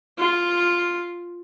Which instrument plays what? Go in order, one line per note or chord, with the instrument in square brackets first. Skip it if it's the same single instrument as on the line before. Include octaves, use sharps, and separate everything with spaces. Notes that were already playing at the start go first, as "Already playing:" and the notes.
[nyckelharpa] F4